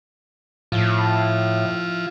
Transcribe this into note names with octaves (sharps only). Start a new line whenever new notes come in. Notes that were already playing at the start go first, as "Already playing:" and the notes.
A2 F3 E4 F4